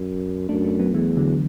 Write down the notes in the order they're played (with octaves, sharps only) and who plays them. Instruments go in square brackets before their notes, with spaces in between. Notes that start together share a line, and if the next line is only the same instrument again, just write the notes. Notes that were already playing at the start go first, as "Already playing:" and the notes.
Already playing: [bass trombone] F#2
[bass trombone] F#2 [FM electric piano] A3 D4
[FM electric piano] A3 D4
F#3 B3
[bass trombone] E2 [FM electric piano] E3 A3
[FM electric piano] D3 F#3